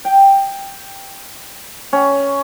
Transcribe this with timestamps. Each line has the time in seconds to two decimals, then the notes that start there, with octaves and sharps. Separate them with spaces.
0.05 G5
1.93 C#4